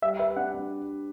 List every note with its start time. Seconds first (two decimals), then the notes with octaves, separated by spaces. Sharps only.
0.02 G3 E5
0.19 B4 E5
0.36 D4 F#5
0.54 D4